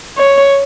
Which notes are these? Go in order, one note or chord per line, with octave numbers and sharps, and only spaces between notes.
C#5